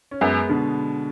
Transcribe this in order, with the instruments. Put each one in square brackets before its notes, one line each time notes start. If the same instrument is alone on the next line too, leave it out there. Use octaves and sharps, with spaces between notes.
[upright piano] C#4
[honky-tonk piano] F#2 [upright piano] G#3 B3
[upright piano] B2 D3